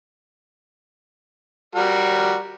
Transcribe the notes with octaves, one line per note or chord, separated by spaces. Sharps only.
G3 F#4 A#4